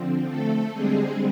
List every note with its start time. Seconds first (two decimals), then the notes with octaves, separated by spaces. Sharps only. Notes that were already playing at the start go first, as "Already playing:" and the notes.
Already playing: D3 F3 C4
0.28 A3 A4
0.73 D3 G3 G#3 C4 G#4